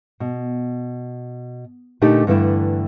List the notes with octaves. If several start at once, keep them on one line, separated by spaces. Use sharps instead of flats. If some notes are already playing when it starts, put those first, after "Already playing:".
B2
A#2 D3 A3 D4 D#4 G4
G2 D3 E3 A3 E4 G5